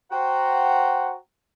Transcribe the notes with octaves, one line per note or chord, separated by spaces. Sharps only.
F#4 C5 F#5 G5 A#5